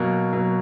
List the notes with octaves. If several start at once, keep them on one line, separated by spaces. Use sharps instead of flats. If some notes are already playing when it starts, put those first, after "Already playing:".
Already playing: B2 F#3 A#3
B2 F#3 A#3